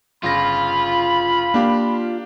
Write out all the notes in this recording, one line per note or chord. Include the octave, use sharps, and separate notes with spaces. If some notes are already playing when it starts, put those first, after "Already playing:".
G1 C#3 F4 B5 A#6
A#3 D4 G4